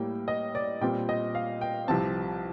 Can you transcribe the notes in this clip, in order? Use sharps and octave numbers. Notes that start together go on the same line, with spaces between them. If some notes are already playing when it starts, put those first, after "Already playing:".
Already playing: A2 G3 A#3 G5
D#5
D5
A#2 G3 C4 G5
D#5
F5
G5
C2 C3 F3 C4 A5